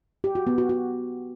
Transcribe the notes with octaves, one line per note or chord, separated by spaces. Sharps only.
G4
F#4
B3
F#4
F#4